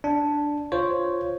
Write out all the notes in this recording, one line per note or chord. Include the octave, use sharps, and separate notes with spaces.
D4
F4 C5 C#5